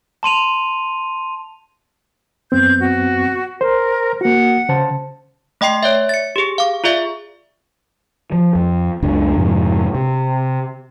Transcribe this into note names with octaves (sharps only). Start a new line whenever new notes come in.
A5 C6 D#7 F7
F#2 B3 C4 G6
F#4
A#4 C5
A#3 F#4 F#5
C#3 C5 A5
A3 D#5 G5 C6 C7
C#5 D5 E5
A6 C#7
G4 G#4
F5 D6
F4 G#4 D5 E5
F3
F2
F#1 C#2 D4
F2 G#2 C3
C3